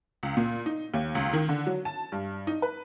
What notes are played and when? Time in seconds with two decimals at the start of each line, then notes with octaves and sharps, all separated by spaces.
0.23 C#2
0.37 A#2
0.66 D#4
0.94 D#2
1.15 C#2
1.33 D#3
1.49 D3
1.67 F#3
1.85 A5
2.12 G2
2.47 D#4
2.62 B4